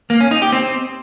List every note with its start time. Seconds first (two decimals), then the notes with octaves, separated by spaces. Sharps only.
0.10 A#3
0.21 C#4
0.31 D#4
0.42 G4
0.53 C4